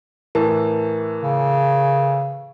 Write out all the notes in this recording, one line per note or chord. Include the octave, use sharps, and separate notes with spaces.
A2 E3 A#4 A5
C#3